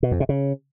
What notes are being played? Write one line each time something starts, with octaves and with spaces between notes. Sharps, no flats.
B2
F2
C3
C#3